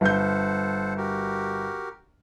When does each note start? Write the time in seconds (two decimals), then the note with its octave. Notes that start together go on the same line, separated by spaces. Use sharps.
0.01 G1 A4 C5 F#5 G6
0.97 F#4 G4 A#4